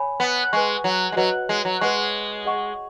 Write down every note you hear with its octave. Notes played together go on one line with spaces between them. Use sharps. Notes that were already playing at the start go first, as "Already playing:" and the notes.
Already playing: C#5 G#5 B5
B3
G#3 B4 G#5 C#6
F#3
G#3
F#3 F#4 B4 D#5
G#3
F#3
G#3 G#4 B4 F#5 C#6
G#4 D#5 F#5 C#6